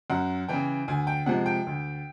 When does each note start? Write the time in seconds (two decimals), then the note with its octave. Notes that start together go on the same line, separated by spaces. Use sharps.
0.10 F#2 F#5
0.49 C#3 E3 G5
0.88 D2 G#5
1.07 G5
1.26 C3 F3 G#3 F#5
1.46 G5
1.67 D2